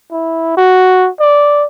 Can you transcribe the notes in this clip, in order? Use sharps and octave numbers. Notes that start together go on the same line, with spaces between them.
E4
F#4
D5